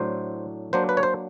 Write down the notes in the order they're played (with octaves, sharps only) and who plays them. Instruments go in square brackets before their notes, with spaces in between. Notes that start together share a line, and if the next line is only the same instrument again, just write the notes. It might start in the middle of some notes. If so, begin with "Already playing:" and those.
Already playing: [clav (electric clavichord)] A2 F#3 A3 D4 C5
F#3 A#3 D4 C5
B4
C#5
C5